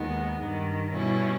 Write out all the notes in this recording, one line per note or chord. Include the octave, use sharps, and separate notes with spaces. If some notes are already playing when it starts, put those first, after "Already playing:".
Already playing: D#2 D#3 G#3 B3
G2 D#3 G3
B2 G3 C#4 E4